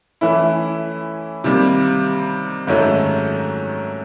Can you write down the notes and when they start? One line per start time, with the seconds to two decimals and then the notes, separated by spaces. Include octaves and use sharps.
0.21 E3 A3 C#4 E4
1.44 C3 D#3 G3 A#3
2.67 G#2 D#3 F#3 A3 C#4